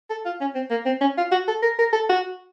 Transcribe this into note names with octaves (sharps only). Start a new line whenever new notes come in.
A4
F4
C#4
C4
A#3
C4
C#4
F4
F#4
A4
A#4
A#4
A4
F#4